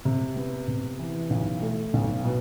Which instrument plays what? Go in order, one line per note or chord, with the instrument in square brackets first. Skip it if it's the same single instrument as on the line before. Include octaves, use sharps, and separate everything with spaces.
[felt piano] C3
B3
C3
E3
B1
A3
B1
B2